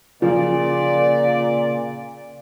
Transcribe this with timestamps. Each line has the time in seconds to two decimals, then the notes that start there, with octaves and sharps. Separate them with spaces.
0.22 A#2 C#3 F3 A#3 D5